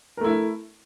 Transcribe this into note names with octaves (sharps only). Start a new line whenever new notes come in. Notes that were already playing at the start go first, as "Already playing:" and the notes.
A3 E4 A#4